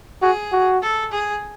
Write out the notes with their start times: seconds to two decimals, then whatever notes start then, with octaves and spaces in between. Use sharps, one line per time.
0.22 F#4 G#4
0.52 F#4
0.82 A4
1.11 G#4